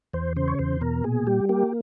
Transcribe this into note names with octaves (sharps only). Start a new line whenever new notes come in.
E2 C5
C#3 C5
C#5
E2 C5
B2 A#4
A#2 G#4
G3 G4
A#3 G4